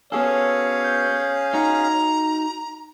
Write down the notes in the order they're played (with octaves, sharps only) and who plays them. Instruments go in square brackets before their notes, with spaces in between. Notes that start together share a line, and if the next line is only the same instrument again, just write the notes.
[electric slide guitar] B3 F#4 A4 [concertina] C#4 G#4 F5 [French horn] C#5
[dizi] G6
[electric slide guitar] D#4 F#4 [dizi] A#5